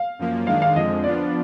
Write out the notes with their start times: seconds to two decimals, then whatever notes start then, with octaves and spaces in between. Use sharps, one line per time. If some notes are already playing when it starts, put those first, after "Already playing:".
Already playing: F5
0.19 F#2 F3 A#3
0.47 D#3 G#3 D4 F5
0.62 F5
0.75 F2 D3 F3 G#3 D#5
1.04 F3 B3 D4 F4 D5